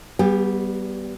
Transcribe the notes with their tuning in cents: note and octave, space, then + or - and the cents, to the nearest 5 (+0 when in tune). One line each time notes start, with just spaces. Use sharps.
G3 -20 B3 -10 G4 +45